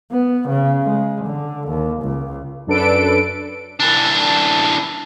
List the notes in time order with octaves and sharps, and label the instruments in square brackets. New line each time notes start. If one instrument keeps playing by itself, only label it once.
[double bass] B3
C#3
G#3
D3
D#2
C#2
[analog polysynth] F#2 D4 A4 B4 D7
[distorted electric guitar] E3 D4